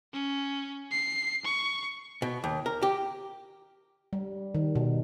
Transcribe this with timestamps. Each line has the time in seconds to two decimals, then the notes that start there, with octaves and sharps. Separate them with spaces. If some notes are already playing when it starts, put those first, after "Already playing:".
0.13 C#4
0.92 C7
1.45 C#6
2.22 B2
2.44 D#2
2.66 A#4
2.83 G4
4.13 G3
4.55 D#3
4.75 B2